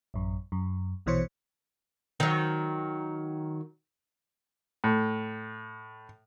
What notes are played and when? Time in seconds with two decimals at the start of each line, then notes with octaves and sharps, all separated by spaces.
0.14 A1 F#2
0.52 F#2
1.06 A#1 B2 E3 C5 C#5 C#7
2.20 D#3 F#3
4.84 A2